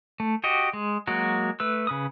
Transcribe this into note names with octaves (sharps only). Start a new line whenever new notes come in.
A3
F#4 G4 D#5
G#3
F#3 G#3 A#3 F#4
A3 B4 E6
C#3 B4 D#6